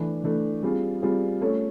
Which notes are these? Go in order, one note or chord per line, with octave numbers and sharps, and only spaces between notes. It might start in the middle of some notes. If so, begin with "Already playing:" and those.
Already playing: E3 A3 D4
E3 A3 D4
G3 C4 F4 G#4
G3 C4 F4 G#4
A3 C#4 F4 A4